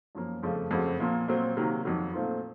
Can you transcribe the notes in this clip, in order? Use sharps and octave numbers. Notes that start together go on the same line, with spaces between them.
F#2 F3 A#3
F2 C#3 F3 A3
F2 C#3 A3 C4 F#4
A#2 F3 A#3 F4
A#2 F#3 C4
C3 D#3 F#3 A#3
F2 D#3 F#3
A#2 A3 C4 F4